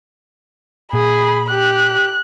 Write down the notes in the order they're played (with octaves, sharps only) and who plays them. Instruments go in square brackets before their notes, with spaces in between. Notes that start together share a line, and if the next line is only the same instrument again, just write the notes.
[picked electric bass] A#2 [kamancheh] G#4 [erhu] B5
[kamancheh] G4 [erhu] F#6